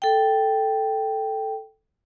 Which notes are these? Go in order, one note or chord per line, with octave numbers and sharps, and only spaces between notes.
A4 G5